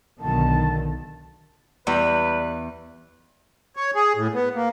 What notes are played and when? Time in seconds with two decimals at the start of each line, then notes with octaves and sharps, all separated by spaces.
0.19 B1 D3 D#3 A5
1.87 E2 G3 B4
3.76 C#5
3.95 G#4
4.16 A2
4.34 B3
4.55 A#3